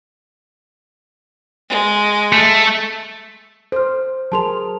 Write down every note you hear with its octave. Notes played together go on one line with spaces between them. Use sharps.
G#3
A3
A4 C5 F6
F#3 G#4 A#4 A5 C6 F7